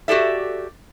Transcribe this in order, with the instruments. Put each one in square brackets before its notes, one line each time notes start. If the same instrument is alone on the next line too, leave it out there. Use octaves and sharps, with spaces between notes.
[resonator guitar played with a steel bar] F#4 G4 A4 D5 E5